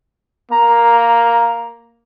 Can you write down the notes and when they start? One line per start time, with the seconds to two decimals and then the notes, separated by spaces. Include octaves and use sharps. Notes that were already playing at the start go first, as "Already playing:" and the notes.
0.51 A#3 A#5